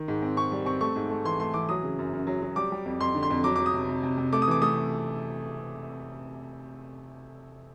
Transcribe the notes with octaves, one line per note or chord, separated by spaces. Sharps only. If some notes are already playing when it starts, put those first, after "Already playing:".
Already playing: D#3
G#2
C4
C4 C#6
G3
C4 C#6
A3 C#6
G#2
A3
E3 C6
A3 C6
E3 D6
F#3 D#6
C#3
F#2
F#2
F#3
F#3
G3 D6
G3
F2
F2 C6
D3
C6
F2
F#3 D6
D6
F#3
D#6
C3
C3
C3
C3
A3 D6
D#6
E3 D6
A3 D#6